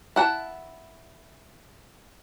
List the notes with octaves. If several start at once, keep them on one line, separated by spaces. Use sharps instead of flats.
E4 F#5 A5